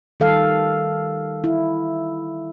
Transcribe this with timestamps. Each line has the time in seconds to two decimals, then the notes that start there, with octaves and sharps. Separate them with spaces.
0.20 D#3 G3 A4 F5
1.44 E4